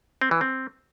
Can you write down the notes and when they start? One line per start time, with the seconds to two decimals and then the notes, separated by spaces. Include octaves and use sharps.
0.22 C4
0.31 E3
0.41 C4